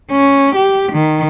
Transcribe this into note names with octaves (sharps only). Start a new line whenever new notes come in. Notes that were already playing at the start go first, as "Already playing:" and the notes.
C#4
G4
D#3